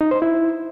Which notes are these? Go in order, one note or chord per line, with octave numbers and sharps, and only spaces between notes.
D#4
C5
E4